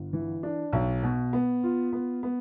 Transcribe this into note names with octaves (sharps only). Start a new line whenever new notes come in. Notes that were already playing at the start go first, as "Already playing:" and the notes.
Already playing: G1
E3
D4
B1
B2
B3
F4
B3
B3